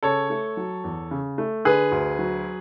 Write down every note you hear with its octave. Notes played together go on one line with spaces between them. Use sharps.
C#3 A4 C#5
A3
F#3
E2
C#3
A3
D3 G#4 B4
D2
F#3